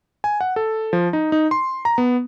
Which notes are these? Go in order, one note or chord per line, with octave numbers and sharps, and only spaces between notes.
G#5
F#5
A4
F3
D#4
D#4
C6
A#5
B3